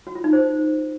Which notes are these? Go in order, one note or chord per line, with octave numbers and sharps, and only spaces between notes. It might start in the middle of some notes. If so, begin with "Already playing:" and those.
F#4
F4
D#4
C5